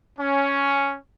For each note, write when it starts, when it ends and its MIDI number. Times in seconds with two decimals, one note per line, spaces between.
0.19 0.97 61